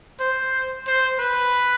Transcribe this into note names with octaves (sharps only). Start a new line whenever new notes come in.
C5
C5
B4